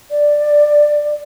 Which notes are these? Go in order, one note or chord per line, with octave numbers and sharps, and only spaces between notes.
D5